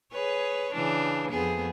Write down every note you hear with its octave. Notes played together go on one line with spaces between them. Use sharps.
G#4 B4 C#5
C#3 E3 D4
F2 B3 G#4